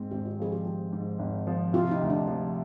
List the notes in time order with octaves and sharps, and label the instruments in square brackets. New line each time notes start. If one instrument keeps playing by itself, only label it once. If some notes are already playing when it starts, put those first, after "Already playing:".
Already playing: [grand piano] G#2 C4
[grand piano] G#1 [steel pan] G4
[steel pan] F4
[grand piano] F3 [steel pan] G#4
[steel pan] G4
[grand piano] F3
G#2
G#1
F3
[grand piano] C3 [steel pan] F4
[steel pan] D#4
[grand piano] D2
[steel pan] D4
[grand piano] F3